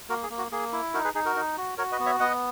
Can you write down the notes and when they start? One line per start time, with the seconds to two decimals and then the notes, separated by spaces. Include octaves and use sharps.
0.09 A#3 F#4 A#4
0.23 G#4
0.30 A#3
0.38 F#4
0.52 A#3 G#4
0.72 E4
0.94 D#4 F#4 A#4
1.04 G#4 B4
1.14 D#4 G#4
1.25 F#4 A#4
1.36 D#4
1.57 F#4
1.78 F#4 A#4 C#5
1.92 B4 D#5
1.99 B3
2.06 C#5 E5
2.20 B3 D#5 F#5